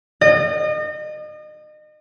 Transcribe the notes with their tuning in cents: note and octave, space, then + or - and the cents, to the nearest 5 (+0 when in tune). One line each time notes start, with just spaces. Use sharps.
D#5 -35